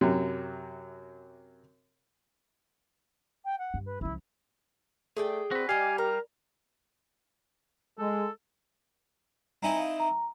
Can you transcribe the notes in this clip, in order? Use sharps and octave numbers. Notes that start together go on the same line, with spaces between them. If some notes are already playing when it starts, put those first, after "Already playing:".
F#2 C3 F#3
G5
F#5
G2
B4
C#2 F3 E4
A3 G#4 D5 G5
C4 F#4 B4
G3 G4 D5 D#5 F5 G#5
A#4 A#5
G#3 A4
C4 D#4 E4 G#5 A#5
E5 F5
A#5